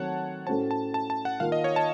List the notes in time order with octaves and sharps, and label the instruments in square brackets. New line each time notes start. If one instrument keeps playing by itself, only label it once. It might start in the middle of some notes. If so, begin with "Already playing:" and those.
Already playing: [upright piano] D#3 F#3 A3 C4 [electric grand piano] C#5 F#5 A5
[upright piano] A2 A3 C#4 F#4 C5 [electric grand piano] A5
[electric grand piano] A5
A5
A5
F#5
[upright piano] D#3 A#3 F4 [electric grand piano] F5
[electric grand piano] D#5
C#5
A5